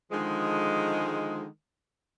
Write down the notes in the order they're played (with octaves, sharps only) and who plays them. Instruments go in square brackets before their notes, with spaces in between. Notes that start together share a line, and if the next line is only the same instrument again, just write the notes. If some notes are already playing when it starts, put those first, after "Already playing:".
[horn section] D3 D#3 F3 G#3